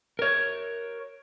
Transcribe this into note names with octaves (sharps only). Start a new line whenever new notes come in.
A#4 C#5